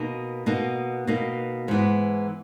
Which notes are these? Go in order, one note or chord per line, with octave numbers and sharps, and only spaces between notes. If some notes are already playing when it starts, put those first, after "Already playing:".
Already playing: B2 A#3 D#4
B2 A#3 D#4
B2 A#3 D#4
G#2 E3 B3